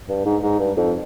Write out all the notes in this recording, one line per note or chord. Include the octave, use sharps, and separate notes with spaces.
G2
G#2
G#2
G2
F2